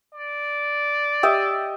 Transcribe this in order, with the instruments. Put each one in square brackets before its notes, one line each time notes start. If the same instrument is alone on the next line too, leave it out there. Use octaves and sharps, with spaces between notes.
[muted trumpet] D5
[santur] G4 D#5 E5